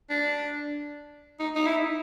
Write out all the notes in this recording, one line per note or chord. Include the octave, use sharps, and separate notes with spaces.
D4
D#4
D#4
E4